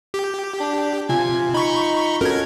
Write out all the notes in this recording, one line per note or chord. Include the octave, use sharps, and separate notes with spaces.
G4
D4
C3 F4 G#5
D#4 B5 C#6
C#4 F#4 A4 A#4 G#6